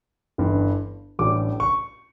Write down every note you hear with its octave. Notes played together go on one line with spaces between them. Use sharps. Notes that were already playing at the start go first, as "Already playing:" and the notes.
G1 G2 E3
A1 A2 G3 D4 D6
C#6